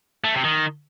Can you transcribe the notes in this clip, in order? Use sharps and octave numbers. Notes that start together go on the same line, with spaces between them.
A3
C3
D#3